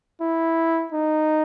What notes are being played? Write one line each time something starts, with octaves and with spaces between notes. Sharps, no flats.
E4
D#4